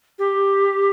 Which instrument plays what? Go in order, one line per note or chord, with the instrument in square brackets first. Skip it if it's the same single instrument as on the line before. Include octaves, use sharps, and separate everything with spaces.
[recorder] G4